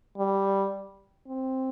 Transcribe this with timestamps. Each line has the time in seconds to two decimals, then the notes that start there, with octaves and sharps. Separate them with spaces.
0.18 G3
1.27 C4